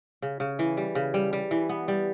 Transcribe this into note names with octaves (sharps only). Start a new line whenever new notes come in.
C#3
C#3
E3
G3
C#3
G3
G3
E3
B3
G3